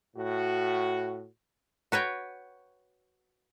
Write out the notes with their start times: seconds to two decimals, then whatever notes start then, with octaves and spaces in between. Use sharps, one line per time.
0.17 A2 F#4
1.92 F#4 B4 C#5 G5